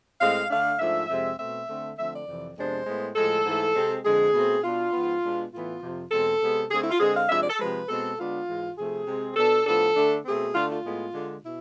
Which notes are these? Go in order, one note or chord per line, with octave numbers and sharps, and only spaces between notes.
A2 G#3 C4 F5
D3 A3 D4 F5
G#2 F3 A3 D4 E5
F2 C3 G#3 C4
B2 A3 C4 E5
D3 A3 C4
D3 F3 A3 C4 E5
D5
F2 C3 E3
F2 C3 G#3 B3 D4 C5
A2 G#3 B3
A2 F3 G#3 A4
G#2 E3 A3
C3 G#3 C4
F2 D3 G#3 G#4
B2 A3 C4
B2 B3 D4 F4
G#2 F3 B3
B2 G#3 B3 D4
A2 E3 B3 F4
F2 C3 F3
E2 B2 G#3 C4 A4
C3 G#3 B3
D3 A3 C4 G#4
E4
F4
D3 G#3 C4 G#4
F5
C3 F3 G#3 D4 E5
D5
A4
C3 F3 G#3 B4
B2 G#3 C4 A4
D3 G#3 B3 D4 F4
G#2 E3 G#3
C3 F3 A3 C4 G#4
C3 G#3 C4
B2 B3 D4 A4
A2 F3 B3 D4 A4
D3 A3 D4
B2 A3 C4 G#4
D3 A3 D4 F4
F4
A2 G#3 B3
D3 G#3 D4
B2 E4